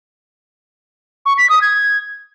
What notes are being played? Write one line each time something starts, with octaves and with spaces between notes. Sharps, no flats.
C#6
B6
D#6
G#6